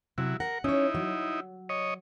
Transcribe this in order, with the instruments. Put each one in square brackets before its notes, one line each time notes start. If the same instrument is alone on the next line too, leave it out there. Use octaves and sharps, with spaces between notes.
[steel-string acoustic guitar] C3 [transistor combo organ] F#3 E4
[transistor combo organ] A#4 [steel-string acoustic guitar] F#5
[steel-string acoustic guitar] C#4 C#5 [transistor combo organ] D#4 E4
[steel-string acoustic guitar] F#3
[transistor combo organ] C#5 D#5